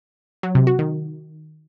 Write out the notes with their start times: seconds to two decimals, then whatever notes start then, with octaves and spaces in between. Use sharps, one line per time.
0.43 F#3
0.55 C3
0.67 F#4
0.79 D#3